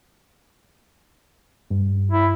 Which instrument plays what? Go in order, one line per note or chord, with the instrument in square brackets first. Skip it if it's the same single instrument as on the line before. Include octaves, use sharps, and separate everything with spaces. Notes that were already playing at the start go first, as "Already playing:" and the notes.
[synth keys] G2
[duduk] E4